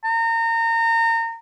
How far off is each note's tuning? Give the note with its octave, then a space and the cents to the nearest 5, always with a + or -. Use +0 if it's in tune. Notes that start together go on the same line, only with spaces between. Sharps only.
A#5 -30